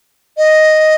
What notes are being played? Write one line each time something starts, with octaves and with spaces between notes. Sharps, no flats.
D#5